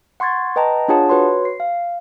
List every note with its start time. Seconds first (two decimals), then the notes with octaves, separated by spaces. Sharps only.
0.20 F#5 C6 C#6 G#6 A6
0.56 B4 D#5 G5 A5 A#5
0.88 D4 F4 G#4 C#5 F#5 A5
1.09 F#4 B4 C#5 C6
1.45 C7
1.60 F5